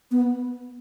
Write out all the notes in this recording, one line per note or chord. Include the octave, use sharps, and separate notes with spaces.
B3